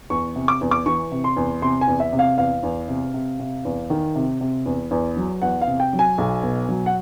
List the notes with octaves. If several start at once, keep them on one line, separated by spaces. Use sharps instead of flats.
E2 C#6
C3
D6
E2
D6
E3 C#6
C3
C6
E2
C3 C6
G#5
E2
E5
C3
F5
E2 F5
E2
C3
C3
C3
E2
D#3
C3
C3
E2
E2
F#3
E2 F#5
F5
C3
G5
F#3
G#5
B1
B2
F#3
F#5